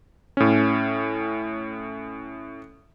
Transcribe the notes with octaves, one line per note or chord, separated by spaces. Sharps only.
A2 C#4